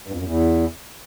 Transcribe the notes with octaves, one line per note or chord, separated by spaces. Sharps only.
G2
F2
F#2
E2